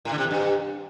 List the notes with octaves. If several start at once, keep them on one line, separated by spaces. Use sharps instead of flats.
A2
D3
C3
E2
G2